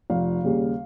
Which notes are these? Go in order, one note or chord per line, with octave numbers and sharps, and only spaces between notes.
F1 F5
D#2 C#3 G3